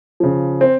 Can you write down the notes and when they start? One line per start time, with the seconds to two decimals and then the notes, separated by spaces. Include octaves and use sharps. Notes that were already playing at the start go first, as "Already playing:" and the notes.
0.20 C#3 F3
0.61 C4